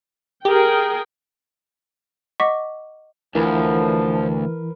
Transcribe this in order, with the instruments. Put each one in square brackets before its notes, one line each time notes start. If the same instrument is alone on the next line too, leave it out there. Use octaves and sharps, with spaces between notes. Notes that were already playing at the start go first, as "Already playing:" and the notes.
[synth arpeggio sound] G4 [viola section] G#4 A#4 G5
[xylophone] D#5 F#5 C#6 D6 B6
[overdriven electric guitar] D2 [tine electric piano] E3 [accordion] F3 [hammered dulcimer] A#4 B4